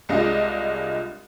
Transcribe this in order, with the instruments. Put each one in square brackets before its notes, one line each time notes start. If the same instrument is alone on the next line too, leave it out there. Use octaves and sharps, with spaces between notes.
[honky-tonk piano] C2 G#3 D4 F4 D#5